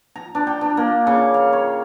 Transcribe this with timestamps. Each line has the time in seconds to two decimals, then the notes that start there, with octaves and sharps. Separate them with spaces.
0.16 A#5
0.35 D4
0.47 G5
0.61 D4
0.77 A#3
1.07 C#3
1.34 F5
1.53 C#5